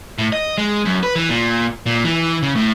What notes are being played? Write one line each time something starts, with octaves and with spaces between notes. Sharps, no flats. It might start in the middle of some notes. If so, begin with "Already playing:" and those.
A2
D#5
G#3
F#2
B4
E3
A#2
A#2
E3
C#3
A2